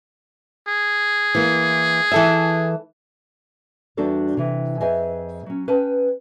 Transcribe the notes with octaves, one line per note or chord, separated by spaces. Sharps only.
G#4
E3 A#3
E3 A4 E5
E2 G3 D4 F#4 A4 D5
C3 E3
F2 G#4 B4 D#5 E5 G#5
F#3 C#4
C#4 B4 G5 A5